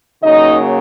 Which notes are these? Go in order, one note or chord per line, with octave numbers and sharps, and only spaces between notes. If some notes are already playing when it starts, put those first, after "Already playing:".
C#3 F#3 A#3 D#4 D#5